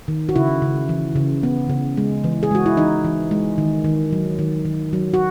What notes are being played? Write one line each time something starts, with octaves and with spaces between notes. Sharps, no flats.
D#3
F#4
C#3 E4
C#3
E3
C#3
B3
C#3
G#3
E3
G#4
G#3 F#4
E4
E3 D#4
E3
G#3
D#3
D#3
F#3
D#3
D#3
F#3
F#4